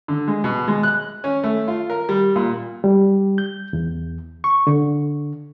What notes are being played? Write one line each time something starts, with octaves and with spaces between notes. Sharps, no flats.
D3
G#3
B2
G#3
F#6
C#4
A3
F4
A#4
G3
A#2
G3
G6
E2
C#6
D3